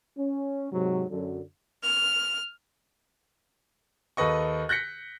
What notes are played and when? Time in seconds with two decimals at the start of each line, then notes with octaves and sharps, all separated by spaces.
0.17 C#4
0.72 G#2 C3 F#3
1.10 F#2 D3
1.82 F6
4.17 D#2 A4 B4 D#5 C#6
4.69 F#6 G6 A#6 B6 C#7